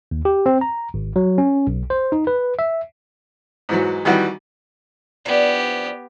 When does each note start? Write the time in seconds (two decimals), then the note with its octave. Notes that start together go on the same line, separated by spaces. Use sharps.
0.11 D#2
0.25 G4
0.46 C4
0.61 A#5
0.94 G#1
1.16 F#3
1.38 C#4
1.67 B1
1.90 C5
2.12 D#4
2.27 B4
2.59 E5
3.69 G#2 E3 F#3
4.05 D#3 E3 F#3 G3 F#4
5.26 F3 B3 D4 E4 G4